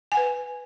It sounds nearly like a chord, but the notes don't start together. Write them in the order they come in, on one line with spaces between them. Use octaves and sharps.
G#5 F#5 B4